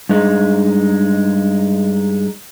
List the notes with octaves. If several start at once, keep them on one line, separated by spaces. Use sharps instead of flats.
G2 G#3 D#4